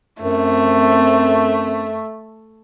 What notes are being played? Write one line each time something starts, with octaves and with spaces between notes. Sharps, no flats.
F#2 A3 C4